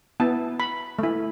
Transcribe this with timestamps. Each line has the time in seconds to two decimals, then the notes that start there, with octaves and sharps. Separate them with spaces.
0.20 B3 E4 A5
0.60 B5
0.99 A3 E4